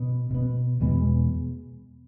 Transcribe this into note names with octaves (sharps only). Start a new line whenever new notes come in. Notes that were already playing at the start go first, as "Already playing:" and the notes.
Already playing: B2 B3
B2 B3
E2 B2 G#3 B3